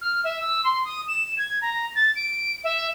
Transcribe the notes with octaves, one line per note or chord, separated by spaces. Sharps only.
F6
E5
E6
C6
D#6
E7
G#6
A#5
A6
D7
E5